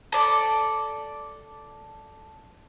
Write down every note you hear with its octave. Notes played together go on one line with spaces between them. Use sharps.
A4 D5